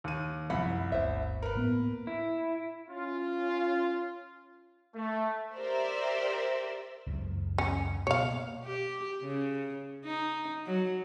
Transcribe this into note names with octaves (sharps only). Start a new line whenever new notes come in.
D#2 D#7
C2 F#2 F3 E4 F#5 B5
G1 D2 C5 E5
A#4 B4
A2 A#3 B3
E4
C#4 F4
A3
G4 A#4 C5 D5 E5
C#2 F#2 E3
C#4
B2 A#3 C#5 F5
G4
C#3
D#4
F#3